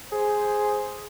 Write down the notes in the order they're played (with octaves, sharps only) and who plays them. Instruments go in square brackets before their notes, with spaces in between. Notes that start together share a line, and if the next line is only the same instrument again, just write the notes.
[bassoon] G#4 [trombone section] C5